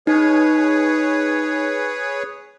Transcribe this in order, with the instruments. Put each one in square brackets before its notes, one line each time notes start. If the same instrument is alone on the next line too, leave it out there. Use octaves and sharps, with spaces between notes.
[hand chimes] D#4 [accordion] G#4 B4 C#5